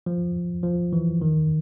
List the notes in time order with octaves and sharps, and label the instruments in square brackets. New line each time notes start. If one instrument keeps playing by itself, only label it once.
[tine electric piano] F3
F3
E3
D#3